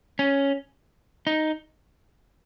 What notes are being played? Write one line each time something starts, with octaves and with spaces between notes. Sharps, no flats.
C#4
D#4